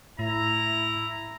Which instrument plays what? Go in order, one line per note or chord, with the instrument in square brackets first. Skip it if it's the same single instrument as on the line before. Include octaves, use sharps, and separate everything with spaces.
[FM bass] A2 [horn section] E4 [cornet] A#5